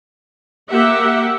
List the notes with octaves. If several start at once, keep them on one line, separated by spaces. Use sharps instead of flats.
A#3 G4 E5 F#5